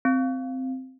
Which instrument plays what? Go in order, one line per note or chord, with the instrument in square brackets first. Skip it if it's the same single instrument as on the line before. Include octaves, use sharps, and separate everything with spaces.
[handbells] C4